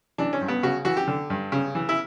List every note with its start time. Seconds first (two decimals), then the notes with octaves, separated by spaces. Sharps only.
0.18 E3 D4
0.33 C#4
0.41 G2
0.48 B3
0.63 C#3 F#4
0.85 E3 F#4
0.97 G4
1.07 D3
1.30 G2
1.52 C#3
1.75 E3
1.89 E4